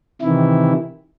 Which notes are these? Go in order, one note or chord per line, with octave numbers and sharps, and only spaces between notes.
C3 D#3 E3 E4